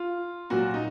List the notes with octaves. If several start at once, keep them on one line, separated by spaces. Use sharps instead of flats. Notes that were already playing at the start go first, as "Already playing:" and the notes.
Already playing: F4
A#2 F#3 F#4
D#4